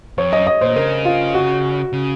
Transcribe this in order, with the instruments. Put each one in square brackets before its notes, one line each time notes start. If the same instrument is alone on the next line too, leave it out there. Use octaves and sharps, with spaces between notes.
[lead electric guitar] F2 [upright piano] C#5
[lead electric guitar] F#2 [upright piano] D#5
[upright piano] D#5
[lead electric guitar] A#2 [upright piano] C5
[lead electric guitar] C#3 [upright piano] A#4
[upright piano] F4
F#4
[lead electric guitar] C#3